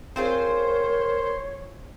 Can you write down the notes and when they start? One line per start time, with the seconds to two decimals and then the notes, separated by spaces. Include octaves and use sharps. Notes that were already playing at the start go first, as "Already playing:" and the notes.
0.16 C4 F4 G#4 A#4 C5 C#5